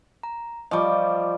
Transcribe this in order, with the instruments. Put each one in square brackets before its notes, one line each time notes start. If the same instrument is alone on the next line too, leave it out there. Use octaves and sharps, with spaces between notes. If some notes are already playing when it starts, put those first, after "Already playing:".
[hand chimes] A#5
[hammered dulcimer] F3 G3 [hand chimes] D#5 C#6 D6